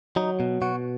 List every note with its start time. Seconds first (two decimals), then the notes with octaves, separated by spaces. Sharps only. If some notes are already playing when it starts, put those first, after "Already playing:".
0.16 F#3 D#4
0.40 B2
0.62 B2 F#4